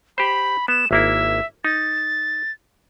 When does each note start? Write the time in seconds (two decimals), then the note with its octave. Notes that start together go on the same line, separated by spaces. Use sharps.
0.18 G4 C5 B5
0.68 B3 E7
0.91 G#1 A#3 E4 E5
1.65 D#4 A6